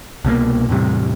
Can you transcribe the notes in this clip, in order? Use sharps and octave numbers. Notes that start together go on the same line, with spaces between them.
C2 B2 G#3 A#3
E2 A2 C3 G3